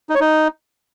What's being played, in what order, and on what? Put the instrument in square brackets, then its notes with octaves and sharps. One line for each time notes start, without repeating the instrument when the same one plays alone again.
[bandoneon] D#4
C#5
D#4